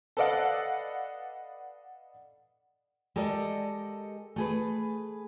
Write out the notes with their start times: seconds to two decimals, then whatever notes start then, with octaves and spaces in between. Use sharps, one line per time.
0.17 A4 B4 D5 D#5 F5 F#5
3.16 G#3 G4 A4 A#4 D5 D#5
4.36 A3 G#4 B4